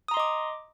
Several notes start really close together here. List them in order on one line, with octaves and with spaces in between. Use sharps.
D#6 A#5 C6 D#5 D6